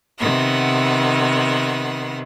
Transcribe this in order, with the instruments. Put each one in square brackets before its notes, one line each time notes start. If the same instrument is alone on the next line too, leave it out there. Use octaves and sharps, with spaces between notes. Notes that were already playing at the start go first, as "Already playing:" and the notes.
[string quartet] C3 D#3 B3 F#5